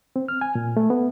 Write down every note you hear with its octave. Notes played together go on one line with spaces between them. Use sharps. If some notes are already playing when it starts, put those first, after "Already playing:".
C4
F6
G#5
A#2
A3
B3